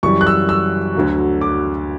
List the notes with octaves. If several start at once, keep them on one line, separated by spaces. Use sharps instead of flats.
F#2 E3 G3 C#6
F#6
E6
E6
D2 D3 F#3
D6